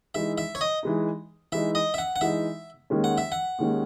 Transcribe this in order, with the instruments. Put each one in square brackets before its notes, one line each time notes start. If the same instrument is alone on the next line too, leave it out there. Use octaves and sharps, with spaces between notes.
[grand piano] E3 G#3 D#4 [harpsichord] E5
[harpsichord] E5
C#5
D#5
[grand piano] E3 G#3 D#4
[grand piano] E3 G#3 D#4 [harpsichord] E5
[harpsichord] D#5
E5
F#5
F#5
[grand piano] E3 G#3 D#4 [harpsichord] E5
[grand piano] D#2 D#3 G#3 C#4
[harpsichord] F#5
E5
F#5
[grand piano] D#2 D#3 G#3 C#4